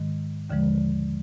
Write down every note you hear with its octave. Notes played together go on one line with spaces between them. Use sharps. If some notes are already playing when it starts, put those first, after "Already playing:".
Already playing: G#2 D#3 G#3
D#2 D3 F3 G#3